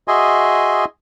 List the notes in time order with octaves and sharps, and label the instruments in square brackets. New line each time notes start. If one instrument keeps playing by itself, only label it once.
[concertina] F#4 G#4 D#5 E5 G#5 C6